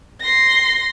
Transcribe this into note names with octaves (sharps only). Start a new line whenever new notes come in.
C6 A#6